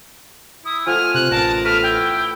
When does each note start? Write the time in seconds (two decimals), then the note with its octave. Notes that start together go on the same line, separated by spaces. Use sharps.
0.65 E4 D#6
0.86 F3 A3 F#5 G#5 F6
1.14 C3 F#6
1.31 A1 A#4 A5
1.65 A3 B3 B4 F6
1.83 E4 G5